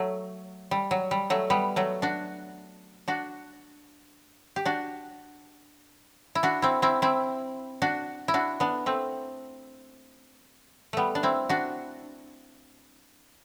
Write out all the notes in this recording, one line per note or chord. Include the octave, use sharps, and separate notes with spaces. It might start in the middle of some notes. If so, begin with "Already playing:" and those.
Already playing: F#3 A3
G3
F#3
G3
F#3 A3
G3 B3
F#3 A3
D4 F#4
D4 F#4
G4
D4 F#4
E4
D4 F#4
C4 E4
C4 E4
C4 E4
D4 F#4
E4
D4 F#4
B3 D4
A3 C4
G3 A3 B3
D4
C4 E4
D4 F#4